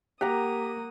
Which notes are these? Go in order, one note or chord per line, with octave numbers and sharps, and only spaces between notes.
A#3 G4 F#5 A#5 D#6